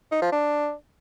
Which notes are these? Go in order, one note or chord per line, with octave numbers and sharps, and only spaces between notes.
D#4
F3
D4